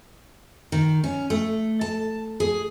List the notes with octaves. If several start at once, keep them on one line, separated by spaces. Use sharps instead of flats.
D#3
C#4
A3
A5
G#4